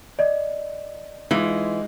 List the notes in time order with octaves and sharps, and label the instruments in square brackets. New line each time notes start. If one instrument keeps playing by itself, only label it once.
[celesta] D5 D#5
[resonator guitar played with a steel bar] E3 [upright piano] G#3 D#4 F4